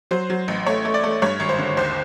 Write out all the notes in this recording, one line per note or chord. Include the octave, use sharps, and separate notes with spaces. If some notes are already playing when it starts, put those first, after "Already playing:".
F#3 C5
F#3
A1
A3 C#5
A3
D5
A3
G2 C#5
G#1
C5
D3
D#2 C5